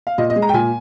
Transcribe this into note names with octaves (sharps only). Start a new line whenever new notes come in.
F5
A#2 D#5
D#5
G#3
A#5
G5
A#2 G#5